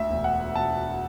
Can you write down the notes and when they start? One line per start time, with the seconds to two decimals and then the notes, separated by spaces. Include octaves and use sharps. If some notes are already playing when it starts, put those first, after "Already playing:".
Already playing: D2 E5
0.10 E1
0.24 F#5
0.55 E1 A5